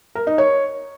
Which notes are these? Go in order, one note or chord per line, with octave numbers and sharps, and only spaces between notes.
A#4
D#4
C#5